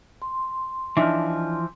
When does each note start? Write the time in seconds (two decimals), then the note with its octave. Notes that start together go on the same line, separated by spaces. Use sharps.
0.22 C6
0.97 E3 F3 D4 D#4 E5